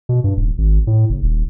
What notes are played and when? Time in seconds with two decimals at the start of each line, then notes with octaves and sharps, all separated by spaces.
0.09 B2
0.24 G2
0.37 D#1
0.58 G#1
0.87 A2
1.09 F#1
1.23 D#1